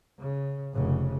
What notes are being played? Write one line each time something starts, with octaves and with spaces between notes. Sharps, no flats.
C#3
F1 C#3